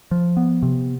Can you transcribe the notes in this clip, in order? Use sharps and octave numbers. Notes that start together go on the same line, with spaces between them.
F3
B3
C3